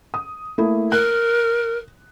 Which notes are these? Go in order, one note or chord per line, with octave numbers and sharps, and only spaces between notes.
D#6
A3 A#3 E4
A#4 F#6